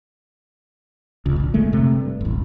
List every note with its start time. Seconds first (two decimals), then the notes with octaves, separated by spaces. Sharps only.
1.26 F1 C#2
1.40 A#1
1.54 F1 D3 G#3 A3
1.72 F1 C3 A3
1.93 G2
2.21 E1 A1